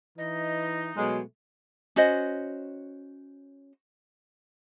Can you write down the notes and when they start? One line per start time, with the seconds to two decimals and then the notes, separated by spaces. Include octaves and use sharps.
0.18 E3 D#4 D#5
0.96 B2 F#3 G#3 A3
1.96 C#4 F#4 C5 D#5